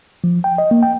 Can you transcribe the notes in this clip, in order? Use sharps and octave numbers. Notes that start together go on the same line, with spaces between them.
F3
G5
D#5
A#3
G5